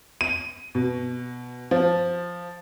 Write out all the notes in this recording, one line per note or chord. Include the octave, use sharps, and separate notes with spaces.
D#7
B2
F3